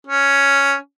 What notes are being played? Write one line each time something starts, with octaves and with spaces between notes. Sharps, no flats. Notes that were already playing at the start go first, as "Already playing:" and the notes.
C#4